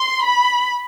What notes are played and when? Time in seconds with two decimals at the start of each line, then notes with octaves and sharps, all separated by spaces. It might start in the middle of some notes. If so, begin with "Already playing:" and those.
Already playing: C6
0.24 B5